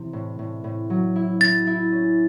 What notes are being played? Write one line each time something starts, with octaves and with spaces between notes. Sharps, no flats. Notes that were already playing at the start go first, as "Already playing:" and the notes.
Already playing: C3 E3 C4
A2
A2
A2
F#3
E4
E4 A6
E4
C#4